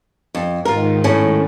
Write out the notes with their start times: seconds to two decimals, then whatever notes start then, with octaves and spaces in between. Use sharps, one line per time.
0.35 F2
0.65 G#2 D#3 F4 A#4
1.04 A2 C#4